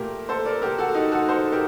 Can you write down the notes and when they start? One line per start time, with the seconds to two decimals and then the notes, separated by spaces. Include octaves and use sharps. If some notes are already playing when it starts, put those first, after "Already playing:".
Already playing: A#2 A3 G4 A#4
0.29 A4 C5
0.45 A#4 D5
0.62 G4 A#4
0.78 F#4 A4
0.95 D#4 G4
1.12 F#4 A4
1.28 A4 C5
1.52 G4 A#4